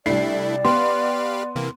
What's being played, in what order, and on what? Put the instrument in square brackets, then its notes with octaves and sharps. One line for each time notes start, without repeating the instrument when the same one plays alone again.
[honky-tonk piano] C2 C7 [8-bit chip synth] A3 D4 E4 [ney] D5
[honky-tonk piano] B3 [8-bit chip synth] G4 B4 F5 [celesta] C6
[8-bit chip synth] C3 E3 A#3